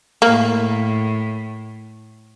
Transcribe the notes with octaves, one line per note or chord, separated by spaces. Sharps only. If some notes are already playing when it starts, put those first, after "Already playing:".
A2 A#3